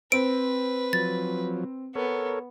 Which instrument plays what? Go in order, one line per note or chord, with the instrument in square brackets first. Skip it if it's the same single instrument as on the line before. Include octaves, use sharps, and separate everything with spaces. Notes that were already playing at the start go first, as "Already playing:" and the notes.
[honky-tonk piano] C4 [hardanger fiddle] B4 [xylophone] D7
[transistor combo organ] F3 F#3 [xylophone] A6
[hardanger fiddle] B3 [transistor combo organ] A4 A#4 C#5